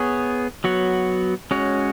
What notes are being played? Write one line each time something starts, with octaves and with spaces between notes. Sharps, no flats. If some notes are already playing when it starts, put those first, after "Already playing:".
Already playing: B3 G#4 C#5
F#3 B3 F#4 C#5
G#3 C#4 F#4 C#5